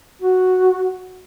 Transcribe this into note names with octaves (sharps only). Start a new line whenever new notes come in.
F#4